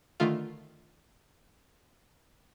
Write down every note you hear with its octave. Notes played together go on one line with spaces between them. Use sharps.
D3 D#3 A3 F4